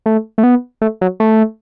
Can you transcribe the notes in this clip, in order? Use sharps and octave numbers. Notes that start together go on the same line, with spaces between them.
A3
A3
B3
A3
F#3
A3